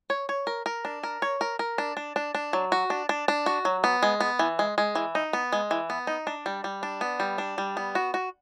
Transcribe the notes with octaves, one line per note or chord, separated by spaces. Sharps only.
C#5
C#5
A#4
A#4
D4
A#4
C#5
A#4
A#4
D4
D4
D4
D4
F#3
F#4
D4
D4
D4
F#4
F#3
B3
G#3
B3
E3
G#3
G#3
E3
D#4
B3
G#3
E3
B3
D#4
D4
G3
G3
D4
B3
G3
D4
G3
B3
F#4
F#4